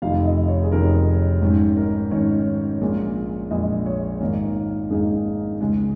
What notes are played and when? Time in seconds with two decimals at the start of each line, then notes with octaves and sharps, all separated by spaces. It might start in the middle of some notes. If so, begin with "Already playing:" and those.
0.02 F1 F2 D#3 F5
0.25 D#5
0.48 C#5
0.63 G#4
0.72 F1 F2 D#3 A#4
1.42 G#1 G#2 D#3 C#4
1.77 A#4
2.11 G#1 G#2 D#3 C#4 C#5
2.81 A#1 A#2 G#3
3.51 A#1 A#2 G#3 D#5
3.86 C#5
4.21 G#1 G#2 D#3 A#3 D#4
4.90 G#1 G#2 D#3 A#3 D#4 G#4
5.61 C#2 C#3 G#3